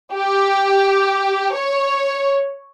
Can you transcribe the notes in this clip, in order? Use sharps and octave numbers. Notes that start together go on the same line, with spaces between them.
G4
C#5